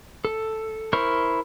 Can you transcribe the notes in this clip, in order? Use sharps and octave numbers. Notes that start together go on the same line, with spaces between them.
A4
E4 A#4 C5 C#6